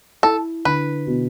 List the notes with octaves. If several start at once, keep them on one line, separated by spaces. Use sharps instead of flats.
E4 A4
D3 B4
B2